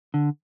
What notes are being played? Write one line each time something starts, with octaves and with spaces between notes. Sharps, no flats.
D3